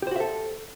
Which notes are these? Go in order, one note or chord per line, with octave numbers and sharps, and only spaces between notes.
F#4 G4 A4 C5 E5